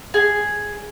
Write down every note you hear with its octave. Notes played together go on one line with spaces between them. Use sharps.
G#4